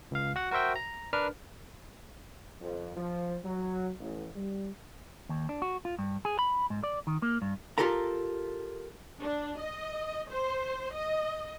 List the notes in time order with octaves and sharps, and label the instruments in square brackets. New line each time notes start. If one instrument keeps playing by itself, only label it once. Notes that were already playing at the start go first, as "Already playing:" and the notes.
[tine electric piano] C#2 F5
F#4 F#5
F#4 A#4 C5 E5 G5
A#5
D4 A#4 B4 F6
[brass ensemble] F2
F3
F#3
A1
G3
[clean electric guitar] D#2
D4
F#4
F4
G2
G#4
B5
G#2
D5
D#3
A#3
G2
[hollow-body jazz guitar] F4 G4 A4 A#4 A#5
[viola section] D4
D#5
C5
D#5